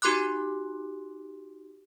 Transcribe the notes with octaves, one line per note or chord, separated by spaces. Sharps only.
D#4 F#4 G4 C6 D6 F#6